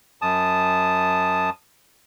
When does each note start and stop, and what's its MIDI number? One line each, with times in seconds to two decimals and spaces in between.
0.22 1.50 42
0.22 1.50 81
0.22 1.50 87